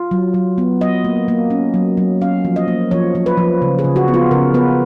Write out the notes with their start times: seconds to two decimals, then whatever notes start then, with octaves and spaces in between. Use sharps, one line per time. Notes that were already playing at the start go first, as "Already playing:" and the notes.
Already playing: F4
0.11 F#3
0.34 F#3
0.58 B3
0.81 F#3 D#5
1.04 A#3
1.28 A#3
1.50 C#4
1.74 F#3
1.97 F#3
2.21 C#4 F5
2.45 F3
2.56 D#5
2.68 A#3
2.91 F3 C#5
3.15 F3
3.26 B4
3.37 F3
3.62 C#3
3.79 G#4
3.84 C#3
3.96 F#4
4.08 B3
4.14 F4
4.31 C#3 A#4
4.54 B3 B4